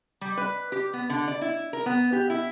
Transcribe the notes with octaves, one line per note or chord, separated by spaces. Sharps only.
G3
B4
G4
B3
D3
D5
E4
A#4
B3
G4
E4